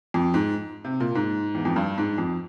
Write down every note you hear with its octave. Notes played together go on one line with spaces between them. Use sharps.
F2
G#2
C3
A#2
G#2
E2
F2
G2
G#2
F2